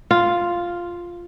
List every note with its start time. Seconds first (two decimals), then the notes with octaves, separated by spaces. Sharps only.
0.11 F4